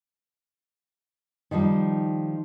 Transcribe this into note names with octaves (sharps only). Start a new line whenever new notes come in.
D#3 F3 G3 D#4